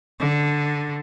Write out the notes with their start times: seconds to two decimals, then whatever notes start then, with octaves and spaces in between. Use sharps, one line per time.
0.20 D3